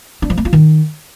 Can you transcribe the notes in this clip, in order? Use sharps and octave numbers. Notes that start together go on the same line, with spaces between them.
D4
F3
A#3
F4
D#3